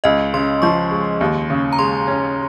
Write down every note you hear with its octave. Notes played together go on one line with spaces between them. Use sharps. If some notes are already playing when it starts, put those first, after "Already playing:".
C#2 D#5
C#3 C6
F3 C#6
G#3
D#2
C#3
A#5
G#3 C6
C#4